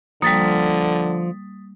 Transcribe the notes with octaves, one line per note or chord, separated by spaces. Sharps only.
D3 F3 G3 A#3 D#6 A6 B6